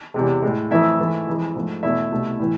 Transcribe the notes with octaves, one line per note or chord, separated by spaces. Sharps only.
E2 C3 G#3
A2 G#3
F2 E3 A3 E4 E5
G#2 E3 A3
F2 E3 G#3
G#2 F3 A3
E2 B2 A3 E4 E5
C2 B2 A3
A2 E3